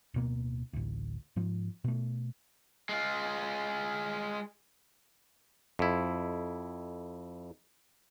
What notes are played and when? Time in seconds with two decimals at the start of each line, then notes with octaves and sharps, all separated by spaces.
0.14 D1 B2 A#3
0.73 A1 D2
1.36 G#2 F3
1.84 B2 A3
2.89 G#3 F4
5.79 F2 E4